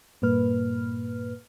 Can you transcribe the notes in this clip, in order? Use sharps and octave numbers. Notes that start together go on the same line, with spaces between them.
G2 A#2 A#3 B4 F6